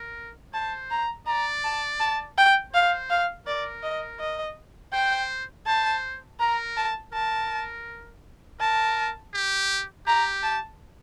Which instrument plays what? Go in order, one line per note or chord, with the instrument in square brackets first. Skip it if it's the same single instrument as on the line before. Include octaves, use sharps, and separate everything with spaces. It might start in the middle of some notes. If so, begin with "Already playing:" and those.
Already playing: [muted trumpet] A#4
[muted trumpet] C5 [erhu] A5
[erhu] A#5
[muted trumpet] D5 [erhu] A#5
[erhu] A5
A5
G5
[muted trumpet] C5 [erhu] F5
[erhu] F5
[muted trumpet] A#4 [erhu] D5
[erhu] D#5
D#5
[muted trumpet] C5 [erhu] G5
[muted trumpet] C5 [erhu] A5
[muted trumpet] A#4 [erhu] A#5
[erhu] A5
[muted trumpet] A#4 [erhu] A5
[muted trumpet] A#4 [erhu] A5
[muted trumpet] G4
[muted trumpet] G4 [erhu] A#5
[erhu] A5